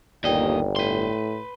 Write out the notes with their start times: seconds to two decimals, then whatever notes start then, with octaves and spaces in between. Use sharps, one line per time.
0.24 G1 D#2 A#2 D5 D#5 G5
0.76 A2 B4 C6